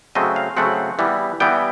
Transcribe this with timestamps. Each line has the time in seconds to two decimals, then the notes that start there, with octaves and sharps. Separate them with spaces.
0.15 C#3 F#3 A3 C4 D#5
0.36 F5
0.57 C#3 F#3 A3 C4 F#5
0.99 E3 G3 B3
1.40 E3 G3 B3 G5